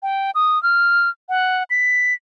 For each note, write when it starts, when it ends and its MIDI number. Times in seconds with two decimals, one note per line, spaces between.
0.03 0.31 79
0.35 0.61 87
0.63 1.09 89
1.29 1.63 78
1.70 2.14 95